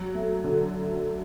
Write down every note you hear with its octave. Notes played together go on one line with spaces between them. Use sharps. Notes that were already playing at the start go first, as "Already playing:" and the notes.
Already playing: F#3
A3
D3